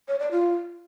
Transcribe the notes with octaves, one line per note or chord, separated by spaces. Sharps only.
C#5
D5
F4